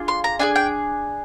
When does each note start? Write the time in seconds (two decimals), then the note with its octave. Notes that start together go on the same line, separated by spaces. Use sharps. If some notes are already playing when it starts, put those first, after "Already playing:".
Already playing: D4 F4 G#4
0.08 C6
0.24 A#5
0.39 D4 F4 G#4 G#5
0.56 G5